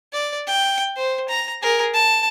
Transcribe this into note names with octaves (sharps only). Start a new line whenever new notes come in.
D5
G5
C5
A#5
G#4 A#4
A5